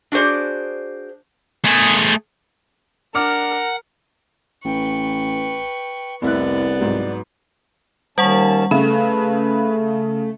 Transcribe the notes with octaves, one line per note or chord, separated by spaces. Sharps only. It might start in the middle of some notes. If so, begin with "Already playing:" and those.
D4 F#4 G#4 C5 D5
A3 G#4
D4 A#4 F#5 D6 F6
A1 B4 G5 C#6
F1 C2 B3 E4 D5 F#6
G#2 F#3
D#2 G3 C#4 F#5 A5 C#6
C#3 A3 B4 B5